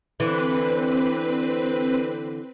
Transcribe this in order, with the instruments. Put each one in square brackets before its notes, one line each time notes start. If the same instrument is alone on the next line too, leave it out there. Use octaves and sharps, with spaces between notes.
[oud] D3 E3 [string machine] C4 B4